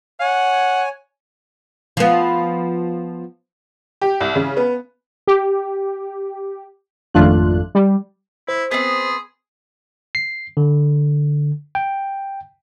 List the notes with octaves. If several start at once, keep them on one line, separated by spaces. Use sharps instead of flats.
C#5 F#5 G#5
F3 B3
G4
C2
C#3
B3
G4
G#1 F2 A3 D4 F4 F#6
G3
E4 C5
B3 C4 G#4
C7
D3
G5